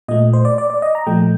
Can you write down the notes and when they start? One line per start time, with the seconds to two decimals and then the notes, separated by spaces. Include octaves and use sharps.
0.08 A#2 A3 D#5
0.33 C5
0.45 D5
0.58 D5
0.70 D5
0.82 D#5
0.95 A#5
1.07 A#2 F3 A3 G5